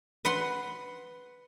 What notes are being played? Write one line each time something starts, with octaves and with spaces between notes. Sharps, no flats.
B4 F#5 C6